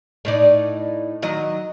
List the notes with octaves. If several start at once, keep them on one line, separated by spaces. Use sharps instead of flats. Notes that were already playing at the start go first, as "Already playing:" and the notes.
A2 D#4 D5
D#3 F#3 D#5